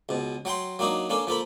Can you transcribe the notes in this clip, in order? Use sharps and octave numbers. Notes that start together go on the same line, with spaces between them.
C#2 B2
F#3 F#5 G5 C6
F#3 A#3 D4 D#4 F#4
A#3 C#4 D4 A4
F3 A#3 A4 B5